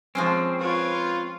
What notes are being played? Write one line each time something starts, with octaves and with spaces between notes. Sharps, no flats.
F3 G#3 C4 C#4
F4 B4 C#5